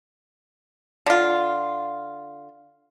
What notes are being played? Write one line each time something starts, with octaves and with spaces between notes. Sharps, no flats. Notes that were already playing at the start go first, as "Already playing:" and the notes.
D3 F4